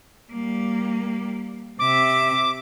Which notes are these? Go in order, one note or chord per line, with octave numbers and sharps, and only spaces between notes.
G3 A#3
C3 E5 D6